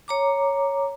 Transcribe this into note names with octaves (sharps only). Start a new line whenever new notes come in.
C#5 A#5 D6